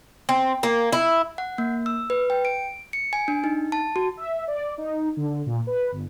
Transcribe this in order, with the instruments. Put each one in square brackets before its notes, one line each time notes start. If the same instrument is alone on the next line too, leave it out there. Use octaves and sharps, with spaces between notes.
[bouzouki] C4
A#3
E4
[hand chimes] F#5
A#3
E6
B4
G5
D7
C#7
G#5
D4
D#4
A5
F#4
[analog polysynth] E5
D5
D#4
D3
A#2
B4
G1